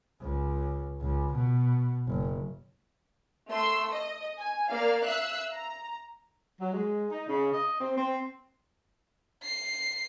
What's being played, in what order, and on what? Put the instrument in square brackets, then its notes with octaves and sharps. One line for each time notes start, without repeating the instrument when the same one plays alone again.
[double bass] C#2
C#2
B2
F#1
[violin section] A3 C6 E6
D#5
G#5
A#3 D5 F5 F6
E5 F5 E6 F#6
A#5
[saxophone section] F#3
G#3
D#4
C#3
D#5
C4
C4
[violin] C7